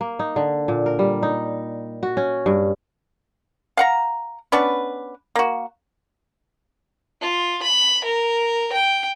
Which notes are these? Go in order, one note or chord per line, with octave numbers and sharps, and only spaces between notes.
A#3
D#4
D3
A#2
A#4
G3
D#4
F#4
C#4
G2
F5 F#5 A#5
B3 C#4 D4 B4
A#3 F#4
F4
B5
A#4
G5